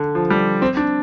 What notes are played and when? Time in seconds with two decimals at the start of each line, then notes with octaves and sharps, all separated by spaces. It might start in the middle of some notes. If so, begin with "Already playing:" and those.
Already playing: D3
0.15 F3
0.30 G3
0.62 C4
0.77 D4